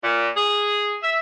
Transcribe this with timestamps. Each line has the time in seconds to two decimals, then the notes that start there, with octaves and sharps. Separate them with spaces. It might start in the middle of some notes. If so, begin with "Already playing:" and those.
0.04 A#2
0.36 G#4
1.02 E5